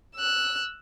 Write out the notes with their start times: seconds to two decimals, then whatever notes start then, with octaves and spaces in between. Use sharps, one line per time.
0.16 E6 F#6